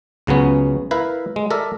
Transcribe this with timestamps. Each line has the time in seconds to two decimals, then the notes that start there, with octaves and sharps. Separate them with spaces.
0.27 C#2 C#3 F#3 B3 C#4
0.91 E4 A#4 B4 E5 F5
1.36 G#3
1.51 A4 A#4 D5 E5